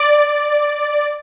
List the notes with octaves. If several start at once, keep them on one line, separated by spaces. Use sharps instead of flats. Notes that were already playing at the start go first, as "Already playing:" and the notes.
Already playing: D5